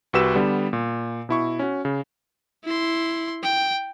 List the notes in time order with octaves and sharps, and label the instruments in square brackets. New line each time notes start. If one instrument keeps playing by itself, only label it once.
[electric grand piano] C2 F#4 G4 B4 E6 E7
D3 G3 B3
A#2
B2 E4 C#6
C#4 F#4
C#3
[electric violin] E4 C6
G5